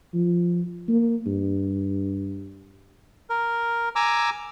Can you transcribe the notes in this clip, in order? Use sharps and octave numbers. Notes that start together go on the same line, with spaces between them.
F3
A#3
G2
A#4
G#5 A#5 D6 E6